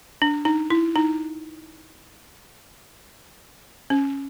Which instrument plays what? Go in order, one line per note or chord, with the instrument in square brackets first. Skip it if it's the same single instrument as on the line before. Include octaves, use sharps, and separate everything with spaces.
[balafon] D4
D#4
E4
D#4
C#4